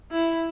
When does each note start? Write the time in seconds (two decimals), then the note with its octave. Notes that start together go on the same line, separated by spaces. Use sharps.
0.12 E4